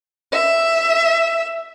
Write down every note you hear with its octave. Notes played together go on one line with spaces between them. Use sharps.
E5